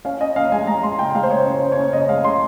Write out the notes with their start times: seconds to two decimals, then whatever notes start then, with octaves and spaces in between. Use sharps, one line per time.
0.05 C#4 F5
0.20 C#4 D#5
0.36 C#4 F5
0.52 G#3 G#5
0.67 G#3 A#5
0.83 G#3 C6
0.99 C#3 G5
1.15 G#3 F5
1.23 C5
1.30 C#3 C#5
1.46 C#4
1.52 C5
1.62 C#4
1.72 C#5
1.77 C#4
1.93 C#3 D#5
2.09 G#3 F5
2.24 C#3 C6